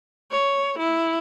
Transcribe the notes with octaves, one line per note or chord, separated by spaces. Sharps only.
C#5
E4